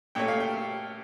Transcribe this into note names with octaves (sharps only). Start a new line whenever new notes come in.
A#2 A3 C#4 G5
F5
G5